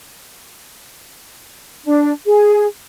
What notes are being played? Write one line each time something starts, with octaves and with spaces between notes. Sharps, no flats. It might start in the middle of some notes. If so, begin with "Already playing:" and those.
D4
G#4